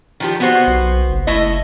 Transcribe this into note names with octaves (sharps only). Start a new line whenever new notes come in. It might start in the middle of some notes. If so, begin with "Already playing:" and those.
D#3 F3 G4
B3 F#4 C5
B1
F#1
A3 E4 D#5